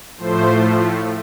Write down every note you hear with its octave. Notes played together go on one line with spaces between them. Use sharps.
A2 F3 A3 C5